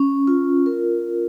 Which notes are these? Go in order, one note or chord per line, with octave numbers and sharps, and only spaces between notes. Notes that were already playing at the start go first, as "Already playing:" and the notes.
Already playing: C#4
F4
A#4